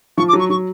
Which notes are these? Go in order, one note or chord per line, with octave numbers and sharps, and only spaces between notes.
F3 C#6
D6
F#3
C#6
F#3 C#6